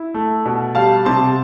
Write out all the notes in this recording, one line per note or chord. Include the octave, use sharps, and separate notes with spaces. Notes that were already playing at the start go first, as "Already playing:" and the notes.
Already playing: E4
A3
B2
G3 F5 A5
C3 A5 C6